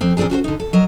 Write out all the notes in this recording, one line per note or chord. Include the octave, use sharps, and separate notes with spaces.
F2 C4
A#2 F3 C4 D4 G#4
C#4 F#4 G#4 C5
D3 D#4
A4
F#3 A#4 D#5